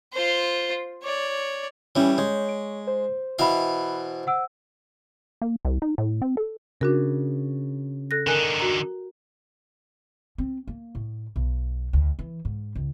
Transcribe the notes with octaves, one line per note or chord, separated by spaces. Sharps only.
F4 C5
C#5 D5
E3 G3 C#4 C#5
G#3 C#5 G6
D7
C5
B2 E3 E5 F5 B5
F#5 E6 D7
A#3
C2
D#4
A2
C4
A4
C#3 D4 F#4 A#4
A4 F#6 A#6
D3 D#4 A#4 G#5 F#6
F#4 A#5
C4
A#3
A2
B1
D2
E3
G#2
C#2